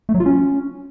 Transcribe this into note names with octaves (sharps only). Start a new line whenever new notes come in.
A3
F#3
F4
C#4